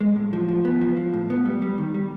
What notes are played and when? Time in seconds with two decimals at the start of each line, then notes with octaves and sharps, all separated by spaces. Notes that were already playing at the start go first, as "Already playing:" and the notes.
0.01 G#3
0.16 A2
0.33 F3
0.48 F3
0.65 B3
0.81 F3
0.97 F3
1.14 A2
1.30 B3
1.45 G3
1.62 G3
1.78 D#3
1.94 G3